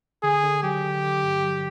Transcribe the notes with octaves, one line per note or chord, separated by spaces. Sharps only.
D3 G#4
D3
F#3 G4
D3
D3
G2
F#3